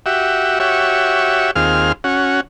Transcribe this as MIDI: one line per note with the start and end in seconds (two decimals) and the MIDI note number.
0.06 0.59 66
0.06 0.59 67
0.06 0.59 76
0.60 1.51 66
0.60 1.51 67
0.60 1.51 73
0.60 1.51 76
1.55 1.92 39
1.55 1.92 60
1.55 1.92 65
1.55 1.92 68
1.55 1.92 89
2.04 2.41 61
2.04 2.41 66